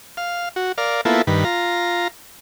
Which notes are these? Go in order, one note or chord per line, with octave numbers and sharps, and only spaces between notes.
F5
F#4
A#4 D5 F5
A#3 B3 E4 F4 A4
G2 D#3 B4
F4 A#5